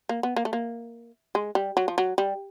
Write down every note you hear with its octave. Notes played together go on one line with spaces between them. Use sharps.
A#3
B3
A#3
A3
A#3
G#3
G3
F#3
F3
F#3
G3